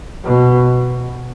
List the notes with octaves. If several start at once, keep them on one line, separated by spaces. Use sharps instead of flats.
B2